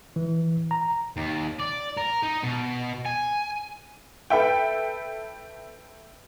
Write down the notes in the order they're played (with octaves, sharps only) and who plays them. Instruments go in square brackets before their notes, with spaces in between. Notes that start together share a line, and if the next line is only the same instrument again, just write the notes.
[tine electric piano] E3
A#5
[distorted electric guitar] D#2
D5
A#4
D#4
B2
G#5
[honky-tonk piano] A4 B4 E5 G5